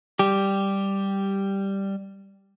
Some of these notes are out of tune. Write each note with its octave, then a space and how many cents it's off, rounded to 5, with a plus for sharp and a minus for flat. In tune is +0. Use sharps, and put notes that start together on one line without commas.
G3 +0 G4 +0